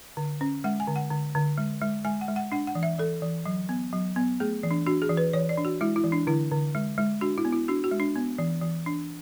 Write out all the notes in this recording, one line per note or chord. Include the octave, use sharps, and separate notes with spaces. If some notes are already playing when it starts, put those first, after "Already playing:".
D3
C#4
G#3 F#5
G#5
D3
F#5
D3
D3
G#3
G#3
G#3 G#5
F#5
G#3
F#5
D4 F#5
F#5
E3
E5
E3 A4
E3
F#3
B3
F#3
B3
A3 G#4
E3
D4
D4 F#4
G#4
E3
B4
E3 C#5
D5
D4
F#4
G#3 E4
E4
E3
D4
D3 E4
D3
G#3
G#3
D4 F#4
E4
B3
E4
D4 F#4
F#4
G#3
D4
B3
E3
E3
D4